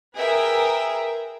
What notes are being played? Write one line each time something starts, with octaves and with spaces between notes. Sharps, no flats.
G#4 A#4 B4 E5 G5